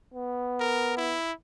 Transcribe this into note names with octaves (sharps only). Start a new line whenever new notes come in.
B3
A#4
E4